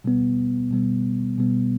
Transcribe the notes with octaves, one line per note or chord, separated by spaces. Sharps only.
B2 G3 B3
B2 G3 B3
B2 G3 B3